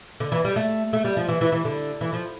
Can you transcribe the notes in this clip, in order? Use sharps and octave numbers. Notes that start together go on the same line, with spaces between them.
D3
E3
G3
A3
A3
G3
F3
E3
E3
E3
D3
E3
F3